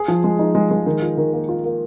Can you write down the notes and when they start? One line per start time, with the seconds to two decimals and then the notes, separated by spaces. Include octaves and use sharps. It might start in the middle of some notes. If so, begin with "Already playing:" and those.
Already playing: G#4
0.08 F3
0.24 G#3
0.39 D#4
0.55 G#3
0.71 G#3
0.86 D#3
1.02 F4
1.17 D#3
1.33 A#3
1.49 F4
1.64 A#3